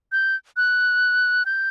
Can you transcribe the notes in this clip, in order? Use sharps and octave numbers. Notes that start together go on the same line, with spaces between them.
G6
F#6
G6